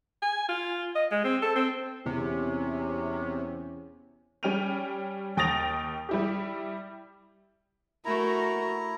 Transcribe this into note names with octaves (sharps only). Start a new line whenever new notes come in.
G#5
F4
D#5
G#3
C4
A4
C4
E2 C3 C#4
G3 C#4 G5 F6 D#7 F7
D#2 G5 D#6 A6 A#6 F7
G3 E4 G4
A3 E4 F#4 A#4 A#5